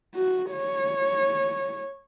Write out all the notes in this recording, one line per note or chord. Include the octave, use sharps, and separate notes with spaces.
F#4
C#5